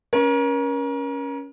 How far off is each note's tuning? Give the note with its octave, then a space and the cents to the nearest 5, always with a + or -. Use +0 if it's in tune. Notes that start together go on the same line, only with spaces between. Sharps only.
C#4 +5 A#4 +35